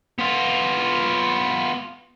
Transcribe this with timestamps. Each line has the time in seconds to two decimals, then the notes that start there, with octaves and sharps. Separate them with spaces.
0.19 B3 F4